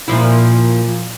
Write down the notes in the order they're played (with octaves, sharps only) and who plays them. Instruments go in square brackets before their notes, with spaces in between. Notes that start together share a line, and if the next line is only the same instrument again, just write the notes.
[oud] A#2 F3 E4